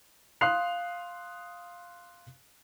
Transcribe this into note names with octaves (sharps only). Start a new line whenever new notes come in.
F5 C6 D#6 F#6 C7 F7